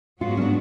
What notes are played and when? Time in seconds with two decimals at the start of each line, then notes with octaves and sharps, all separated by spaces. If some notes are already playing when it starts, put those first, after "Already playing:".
0.21 G#2 F#3 B3 F4 F#4
0.37 C#4
0.41 D4